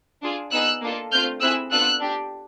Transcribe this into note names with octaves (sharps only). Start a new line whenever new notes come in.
D4 F4 G#4
B3 D#4 G#4 E6 F#6
A#3 D4 F4 A4
A3 C4 F4 F6 G6
C4 E4 G#4 E6 F#6
B3 D4 F4 A4 E6 F#6
D4 G4